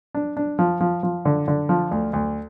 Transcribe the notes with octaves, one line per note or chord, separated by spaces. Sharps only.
D4
D4
F3
F3
F3
D3
D3
F3
D2
D2